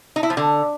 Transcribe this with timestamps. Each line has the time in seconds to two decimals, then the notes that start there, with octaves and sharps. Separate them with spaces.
0.16 D#4
0.23 E4
0.30 F3
0.37 D3